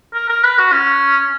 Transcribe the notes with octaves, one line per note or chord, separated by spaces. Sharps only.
A#4
A#4
B4
F#4
C#4